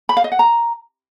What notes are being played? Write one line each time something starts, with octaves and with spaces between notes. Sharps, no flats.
B5
F5
D#5
F#5
A#5